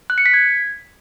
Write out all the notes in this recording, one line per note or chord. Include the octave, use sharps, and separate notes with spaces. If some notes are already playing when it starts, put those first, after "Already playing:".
F#6
C#7
B6
G#6